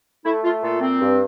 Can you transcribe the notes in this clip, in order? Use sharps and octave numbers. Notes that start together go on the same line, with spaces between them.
A3 E4
A3 F4
A#2 F4 A4
C4
G2